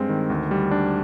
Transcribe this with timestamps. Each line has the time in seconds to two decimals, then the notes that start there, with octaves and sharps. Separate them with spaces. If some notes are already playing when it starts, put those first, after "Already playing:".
Already playing: G2 G#3 C4
0.09 D#3
0.30 D2
0.51 G3
0.71 D4